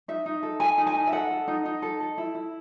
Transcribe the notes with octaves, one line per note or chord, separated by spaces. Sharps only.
D#4 E5
D#4
A4
A4 G#5
D#4
G#5
D#4
E5
A4 F#5
A4
D#4
D#4
A4
A4
E4
E4